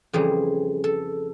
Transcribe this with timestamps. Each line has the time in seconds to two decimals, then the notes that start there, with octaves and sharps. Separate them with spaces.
0.13 F2 C#3 E3 G3 G#4
0.84 A4